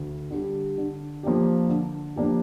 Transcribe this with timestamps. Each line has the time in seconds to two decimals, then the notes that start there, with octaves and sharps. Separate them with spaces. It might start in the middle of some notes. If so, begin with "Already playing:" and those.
Already playing: D2
0.30 D3 G3
0.78 D3
1.23 F3 A#3 D4 G4
1.69 D3
2.16 F3 A#3 D4 G4